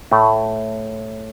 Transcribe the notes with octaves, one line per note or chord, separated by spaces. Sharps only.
A2 A3